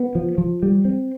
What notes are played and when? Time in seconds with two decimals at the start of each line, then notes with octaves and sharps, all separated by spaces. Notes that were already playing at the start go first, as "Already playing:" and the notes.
Already playing: B3
0.15 F3
0.38 F3
0.63 G3
0.85 C4